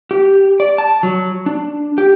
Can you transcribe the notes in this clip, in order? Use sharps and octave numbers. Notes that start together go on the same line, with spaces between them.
G4
D5
A5
F#3
D4
G4